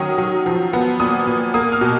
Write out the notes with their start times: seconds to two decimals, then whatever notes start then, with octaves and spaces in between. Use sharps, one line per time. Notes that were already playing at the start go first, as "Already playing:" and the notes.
Already playing: D#3 F#3 C#4 D#6
0.18 F#3
0.46 F3
0.73 B3
1.00 A#2 D#6
1.27 A#2
1.54 A#3 D#6
1.72 F6
1.81 B2